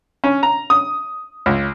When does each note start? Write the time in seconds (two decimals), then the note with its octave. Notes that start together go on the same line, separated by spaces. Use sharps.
0.24 C#4
0.43 A#5
0.70 D#6
1.46 C#2